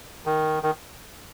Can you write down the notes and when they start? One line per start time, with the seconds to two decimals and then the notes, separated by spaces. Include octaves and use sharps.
0.26 D#3
0.63 D#3